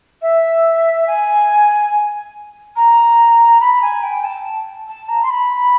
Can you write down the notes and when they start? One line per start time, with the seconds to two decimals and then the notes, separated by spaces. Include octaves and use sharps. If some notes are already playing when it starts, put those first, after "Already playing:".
0.22 E5
1.07 G#5
2.76 A#5
3.60 B5
3.81 G#5
4.03 G5
4.24 A5
4.88 A5
5.09 A#5
5.23 C6
5.30 B5